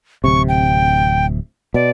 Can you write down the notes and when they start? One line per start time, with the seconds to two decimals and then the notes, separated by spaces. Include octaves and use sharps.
0.24 D1 C3 C#6
0.49 G5
1.74 B2 D5